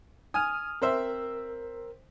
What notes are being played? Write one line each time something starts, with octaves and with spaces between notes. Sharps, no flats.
G#5 D#6 F6
C4 A#4 C5 E5